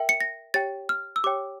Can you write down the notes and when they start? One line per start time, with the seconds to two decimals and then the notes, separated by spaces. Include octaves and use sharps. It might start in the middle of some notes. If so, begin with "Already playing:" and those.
Already playing: A#4 E5 G5
0.09 C#7
0.21 A#6
0.54 G4 C#5 G5 A6
0.89 F6
1.16 E6
1.24 G4 C#5 G5 D6